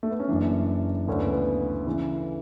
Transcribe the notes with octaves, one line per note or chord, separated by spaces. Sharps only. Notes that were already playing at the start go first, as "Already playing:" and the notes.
A3
B3
C#4
F#1 F#2 E3 D4
D2 C#3 E3 C#4
B3
B3
C#3 E3